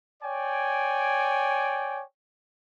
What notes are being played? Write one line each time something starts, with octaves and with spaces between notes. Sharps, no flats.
C#5 D5 G5 G#5